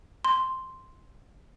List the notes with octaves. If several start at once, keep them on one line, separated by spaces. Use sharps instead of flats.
C6